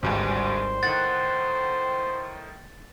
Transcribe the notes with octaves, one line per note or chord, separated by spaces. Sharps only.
G#1 D2 G2 G3 G#3 C5
A2 D#3 F#5 A6